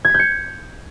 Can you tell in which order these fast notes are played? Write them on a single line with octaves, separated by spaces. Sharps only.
G#6 B6 G6 C#7